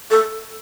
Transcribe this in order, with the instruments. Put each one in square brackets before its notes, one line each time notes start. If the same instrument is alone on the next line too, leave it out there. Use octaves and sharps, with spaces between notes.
[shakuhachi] A4